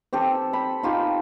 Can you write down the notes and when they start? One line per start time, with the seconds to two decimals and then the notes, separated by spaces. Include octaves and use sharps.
0.13 C4 G4 A4
0.53 B5
0.83 D#4 F4 G4